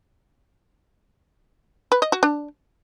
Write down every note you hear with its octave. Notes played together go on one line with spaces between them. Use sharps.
B4
D#5
F#4
D4